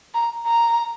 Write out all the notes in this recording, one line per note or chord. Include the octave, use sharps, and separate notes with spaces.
A#5
A#5